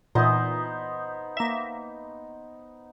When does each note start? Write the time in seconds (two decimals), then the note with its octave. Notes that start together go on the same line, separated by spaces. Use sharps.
0.15 A#2 E3 B3 D#4 C5
1.37 A#3 E5